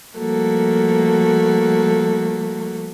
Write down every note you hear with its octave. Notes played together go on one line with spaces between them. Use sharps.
F3 G3 A3 A#3 F#4 A4